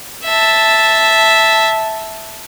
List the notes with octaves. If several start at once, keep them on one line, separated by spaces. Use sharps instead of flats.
E5 A5